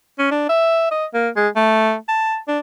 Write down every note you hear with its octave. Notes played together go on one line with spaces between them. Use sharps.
C#4
D4
E5
D#5
A#3
G#3
A3
A5
D4